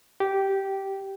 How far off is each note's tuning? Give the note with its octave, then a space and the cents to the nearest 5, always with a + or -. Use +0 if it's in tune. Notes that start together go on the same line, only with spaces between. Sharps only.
G4 -10